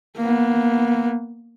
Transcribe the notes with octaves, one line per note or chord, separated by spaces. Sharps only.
A#3 B3